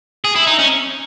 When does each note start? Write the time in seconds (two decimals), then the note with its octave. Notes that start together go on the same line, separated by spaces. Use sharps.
0.24 G#4
0.36 E4
0.47 D#4
0.59 C#4